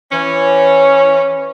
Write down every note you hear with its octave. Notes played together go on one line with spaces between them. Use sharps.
E3 C#4